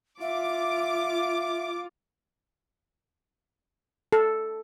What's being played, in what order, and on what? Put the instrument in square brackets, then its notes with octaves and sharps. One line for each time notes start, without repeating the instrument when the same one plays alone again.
[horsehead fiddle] F4 [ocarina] E5 [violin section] D6
[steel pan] A4